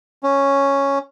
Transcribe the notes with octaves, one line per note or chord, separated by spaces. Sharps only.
C#4